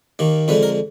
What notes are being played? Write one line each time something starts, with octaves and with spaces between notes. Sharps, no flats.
D#2 D#3 A#3
F2 D3 G#3 B4
A#4